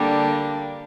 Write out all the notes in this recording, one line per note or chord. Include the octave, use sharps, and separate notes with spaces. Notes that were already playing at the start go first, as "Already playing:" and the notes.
Already playing: D3 G3 A#3 D4